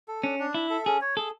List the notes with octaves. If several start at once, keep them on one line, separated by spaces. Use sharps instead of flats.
A4
C#4 D4
D4
E4 E5
A4
C#4 G#4
C#5
G#4 A4